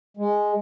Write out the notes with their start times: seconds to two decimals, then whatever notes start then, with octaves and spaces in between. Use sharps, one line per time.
0.17 G#3